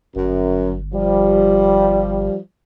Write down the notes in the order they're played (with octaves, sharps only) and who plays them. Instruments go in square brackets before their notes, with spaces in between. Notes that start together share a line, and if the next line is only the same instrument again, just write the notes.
[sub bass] G1 [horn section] F#2
[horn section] F3 G3